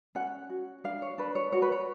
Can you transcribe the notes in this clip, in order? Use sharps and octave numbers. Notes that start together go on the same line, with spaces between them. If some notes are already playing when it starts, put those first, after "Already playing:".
C#4 F#5
F#4
D4 F5
C#5
D4 B4
C#5
F#4 C#5
B4
C#5